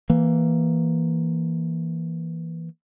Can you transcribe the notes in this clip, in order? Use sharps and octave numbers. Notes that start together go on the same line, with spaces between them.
E3 A#3